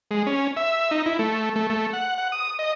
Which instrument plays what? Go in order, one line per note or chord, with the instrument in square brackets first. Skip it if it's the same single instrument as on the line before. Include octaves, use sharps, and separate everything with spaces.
[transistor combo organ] G#3
C#4
E5
D#4
E4
A3
A3
A3
F#5
F#5
D#6
D#5